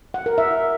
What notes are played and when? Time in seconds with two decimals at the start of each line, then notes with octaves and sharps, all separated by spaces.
0.14 F#5
0.26 A#4
0.38 E5